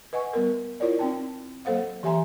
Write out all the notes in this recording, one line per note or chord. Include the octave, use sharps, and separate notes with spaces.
B4 D#5 F#5 G#5 C#6
G3 B3 A#4
E4 F4 A#4 C#5 D5
C4 D#4 G5 A5
F#3 A#3 A4 C5 F5 F#5
E3 G4 E5 G#5 A#5 C6